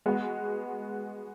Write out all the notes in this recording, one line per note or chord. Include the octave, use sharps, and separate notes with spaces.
G#3 B3 F#4